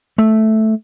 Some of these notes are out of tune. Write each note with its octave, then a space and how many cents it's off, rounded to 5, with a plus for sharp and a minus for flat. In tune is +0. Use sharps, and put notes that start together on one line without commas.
A3 -5